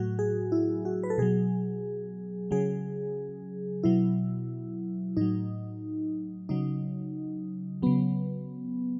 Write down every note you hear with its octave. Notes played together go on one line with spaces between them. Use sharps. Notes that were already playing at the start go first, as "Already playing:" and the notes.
Already playing: A2 F#3 F#4
G#4
E4
F#4
B4
A4
B2 F#3 G#4
C#3 F#3 G#4
B2 F#3 E4
A2 F#3 D#4
C#3 F#3 D#4
C#3 F#3 B3